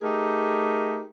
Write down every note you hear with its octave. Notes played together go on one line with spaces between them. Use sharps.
A3 D#4 G4 G#4 A#4